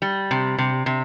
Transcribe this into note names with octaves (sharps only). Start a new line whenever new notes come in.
G3
C3
C3
C3